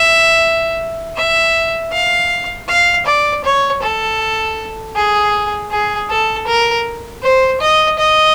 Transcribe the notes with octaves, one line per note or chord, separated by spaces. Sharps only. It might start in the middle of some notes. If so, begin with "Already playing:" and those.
Already playing: E5
E5
F5
F5
D5
C#5
A4
G#4
G#4
A4
A#4
C5
D#5
D#5